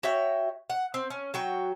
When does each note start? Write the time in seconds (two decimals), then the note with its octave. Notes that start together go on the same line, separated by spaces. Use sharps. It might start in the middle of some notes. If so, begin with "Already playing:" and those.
0.03 F#4 C#5 E5 G5
0.70 F#5
0.94 C4
1.10 C#4
1.34 F#3 F#4 G5